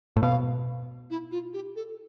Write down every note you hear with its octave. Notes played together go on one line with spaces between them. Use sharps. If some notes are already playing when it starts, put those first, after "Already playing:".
A2
B2 F5
E4
F4
G4
A4